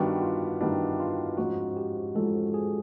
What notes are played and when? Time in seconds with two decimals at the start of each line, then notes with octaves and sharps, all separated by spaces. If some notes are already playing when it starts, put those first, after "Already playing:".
Already playing: G2 D#3 G3 B3 D4 F#4
0.22 F4
0.61 G2 D#3 G3 B3 D4 E4
1.00 F4
1.37 G#2 F3 G#3 C#4 F4 F#4
1.77 G4
2.15 G#2 F3 G#3 C#4 F4 A4
2.54 G#4